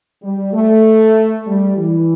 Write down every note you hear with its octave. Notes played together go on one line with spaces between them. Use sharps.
G3
A3
G3
E3